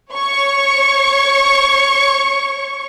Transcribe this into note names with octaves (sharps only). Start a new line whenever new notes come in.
C#5 C#6